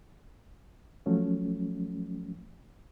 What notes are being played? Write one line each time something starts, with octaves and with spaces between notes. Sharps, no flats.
F3 F#3 A3 C#4